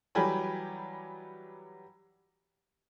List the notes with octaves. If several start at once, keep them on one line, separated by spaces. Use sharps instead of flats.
E3 F#3 G3 G4 G#5 B5